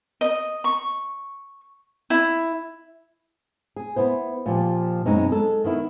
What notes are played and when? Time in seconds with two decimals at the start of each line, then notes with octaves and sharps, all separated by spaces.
0.21 D#5
0.64 C#6
2.10 E4
3.76 G#4
3.96 B3 E4 C5
4.46 A#2 F3 G4
5.06 F#2 B2 G#3 C4 D#4
5.32 G#3 A4
5.64 D#3 B3 E4